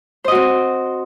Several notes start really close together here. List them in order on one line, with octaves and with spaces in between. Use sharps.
C5 D#5 F#4 C4